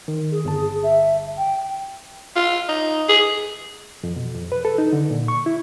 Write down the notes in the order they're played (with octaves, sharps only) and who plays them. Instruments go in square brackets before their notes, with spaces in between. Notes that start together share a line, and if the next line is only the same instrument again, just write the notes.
[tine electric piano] D#3
[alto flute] G#4
[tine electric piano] G1 A5
[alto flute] E5
G5
[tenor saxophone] F4
D#4
G#4
[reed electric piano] F2
B2
F2
B4
A4
D#4
D3
A#2
C#6
E4